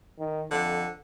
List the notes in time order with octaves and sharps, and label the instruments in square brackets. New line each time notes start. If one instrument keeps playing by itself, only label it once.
[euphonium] D#3
[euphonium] F2 [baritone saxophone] D3